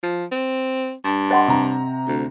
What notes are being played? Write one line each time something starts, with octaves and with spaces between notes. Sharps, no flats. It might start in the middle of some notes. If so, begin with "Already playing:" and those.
F3
C4
G2
D#5 F#5 C6
C3 A#5
D2